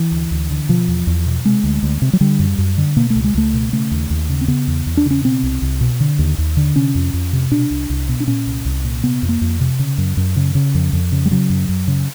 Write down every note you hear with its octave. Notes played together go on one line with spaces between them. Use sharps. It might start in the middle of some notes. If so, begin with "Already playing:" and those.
Already playing: E3
D2
D2
D3
B2 F3
E2
E2
B2
C3 G#3
D2
D2
C3
F#3
D3 G3
F#2
F#2
D3
B2 A#3
A3
C#2
G#3
C#2 A3
B2
C#3 A3
D#2
D#2
C#3
C4
C#3 B3
E2
E2
D4
C#3
C#4
B2 C4
C2
C2
B2
D3
D#2
D#2
D3
C3 C#4
F2
F2
C3
B2 D4
C2
C2
B2
D4
A#2 C#4
C2
C2
A#2
C3 B3
F2
A#3
F2
C3
C#3
F#2
F#2
C#3
C#3
F2
F2
C#3
G3
C#3 F#3
F#2
F#2
C#3